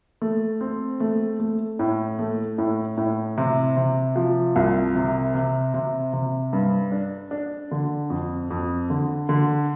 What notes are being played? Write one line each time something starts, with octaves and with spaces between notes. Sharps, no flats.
A3
C4
A3
A3
A2
A3
A2
A2
C3
C3
F3
C2
C3
C3
C3
C3
G2
D4
D4
D3
F2
F2
D3
D3